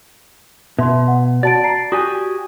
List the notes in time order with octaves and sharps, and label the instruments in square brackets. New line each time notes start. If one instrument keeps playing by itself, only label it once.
[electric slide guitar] B2 [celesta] E5 C6
[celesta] F#5
[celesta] F#4 A5 D7 [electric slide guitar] D5
[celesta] A5 A#5 C7
[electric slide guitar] F#4 G4 G#5 [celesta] D#6